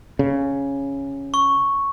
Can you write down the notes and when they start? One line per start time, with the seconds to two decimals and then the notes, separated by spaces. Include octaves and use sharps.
0.19 C#3
1.34 C#6